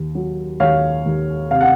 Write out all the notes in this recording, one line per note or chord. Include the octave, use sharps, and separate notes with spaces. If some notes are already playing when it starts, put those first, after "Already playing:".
Already playing: D#2
F#3
D#2 C#5 F5
D#2
C3 F5
F#5